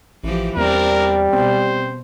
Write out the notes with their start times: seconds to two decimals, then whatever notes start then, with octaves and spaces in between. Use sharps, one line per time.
0.24 A1 E3 F3 G4
0.57 E2 G3 C4 D4 A#4
1.33 B2 C4 C5